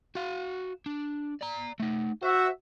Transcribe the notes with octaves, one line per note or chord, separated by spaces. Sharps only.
F#4 F5
D4
D5 A#5
A3 D#4
F#4 C5 E5